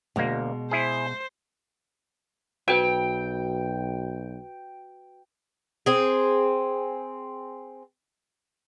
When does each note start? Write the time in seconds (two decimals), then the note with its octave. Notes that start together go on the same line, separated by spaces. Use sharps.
0.16 D2 B2 G#3 A#3
0.71 E4 G#4 C5
2.68 B1 F#4 B4 G5
5.86 C4 G#4